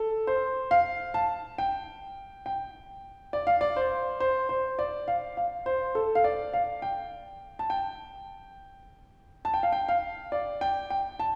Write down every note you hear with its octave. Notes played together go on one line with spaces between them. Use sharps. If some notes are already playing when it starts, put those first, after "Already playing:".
Already playing: A4
C5
F5
A5
G5
G5
D5
F5
D5
C5
C5
C5
D5
F5
F5
C5
A4
F5
D5
F5
G5
A5
G5
A5
G5
F5
G5
F5
D5
G5
G5
A5